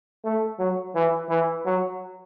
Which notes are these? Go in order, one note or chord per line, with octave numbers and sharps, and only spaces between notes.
A3
F#3
E3
E3
F#3